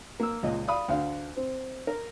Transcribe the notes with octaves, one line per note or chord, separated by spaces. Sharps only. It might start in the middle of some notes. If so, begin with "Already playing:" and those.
A#3 E6
C#2 A#2 D#5
D5 F5 B5 D#6
D2 D3 F5
C4
A#4